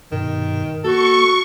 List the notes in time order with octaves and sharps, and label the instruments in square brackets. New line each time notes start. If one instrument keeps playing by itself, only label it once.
[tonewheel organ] G2 B2 [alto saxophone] D#3
[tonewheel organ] A#3 [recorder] F#4 [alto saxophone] A4 [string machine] C#6